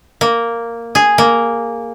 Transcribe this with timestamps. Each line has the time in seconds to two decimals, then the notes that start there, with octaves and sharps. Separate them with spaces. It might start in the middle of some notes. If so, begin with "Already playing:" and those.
0.21 A#3
0.95 G#4
1.18 A#3